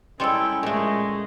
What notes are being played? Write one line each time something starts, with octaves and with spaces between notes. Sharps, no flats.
G3 G#3 C#4 E4 A4 G5 C6 E6
A#2 G#3 A3